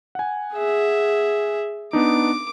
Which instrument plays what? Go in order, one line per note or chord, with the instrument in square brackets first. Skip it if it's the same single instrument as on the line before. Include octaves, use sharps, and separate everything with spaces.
[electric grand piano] F#5 G#5
[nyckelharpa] G#4 E5
[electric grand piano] B3 D4 D#4 [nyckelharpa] D6